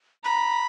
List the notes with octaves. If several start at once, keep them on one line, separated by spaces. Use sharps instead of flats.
A#5 B5